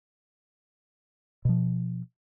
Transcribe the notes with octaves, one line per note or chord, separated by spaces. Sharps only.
B2 F3